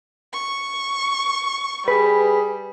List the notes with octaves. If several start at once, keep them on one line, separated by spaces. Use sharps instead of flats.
C#6
G3 G#4 B4